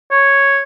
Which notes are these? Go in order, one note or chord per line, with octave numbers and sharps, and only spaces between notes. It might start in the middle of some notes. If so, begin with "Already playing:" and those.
C#5